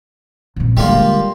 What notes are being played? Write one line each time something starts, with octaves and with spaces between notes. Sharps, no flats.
F2 A#2
D3 G3 G#3 A#3 F4